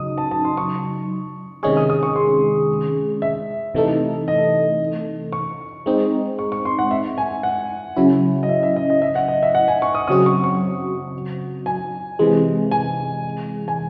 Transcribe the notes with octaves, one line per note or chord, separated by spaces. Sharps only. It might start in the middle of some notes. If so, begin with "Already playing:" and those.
Already playing: C#3 F#3 D#4 D#6
A5
A5
C6
C#6
C3 D#3 G#3 C#4 G#4 C#6
D#6
D#6
C#6
C6
E5
C3 E3 A3 D#4 A4
D#5
C#6
G#3 C4 D#4
C#6
C#6
C6
F#5
E5
G#5
F#5
C#3 F#3 C#4 E4
D#5
E5
E5
D#5
D#5
E5
F#5
D#5
E5
F#5
G#5
C#6
D#6
C#3 F#3 C4 F#4 D#6
C#6
C#6
G#5
C3 E3 G#3
G#5
G#5